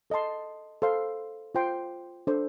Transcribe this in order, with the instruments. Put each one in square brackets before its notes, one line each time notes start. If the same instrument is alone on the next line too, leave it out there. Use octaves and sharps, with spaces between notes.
[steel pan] A4 D#5 A5 C6
A4 C5 F5 C6
F4 C5 G5 C6
D4 A4 C5